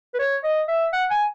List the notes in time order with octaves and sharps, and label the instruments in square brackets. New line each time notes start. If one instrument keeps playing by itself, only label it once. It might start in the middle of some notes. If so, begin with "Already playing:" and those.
[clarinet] B4
C#5
D#5
E5
F#5
G#5